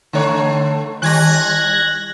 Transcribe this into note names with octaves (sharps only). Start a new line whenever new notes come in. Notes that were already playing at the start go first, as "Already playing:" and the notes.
D3 A3 C#5
D#3 G3 F#6 G#6 A#6